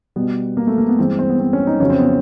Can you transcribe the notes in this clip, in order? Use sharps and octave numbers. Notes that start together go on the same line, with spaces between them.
B2 G3 B3
A#3
A3
A#3
B3
G2 E3 G#3 C4
C4
B3
C4
C#4
D#4
F2 C#3 F#3 C#4
C4
B3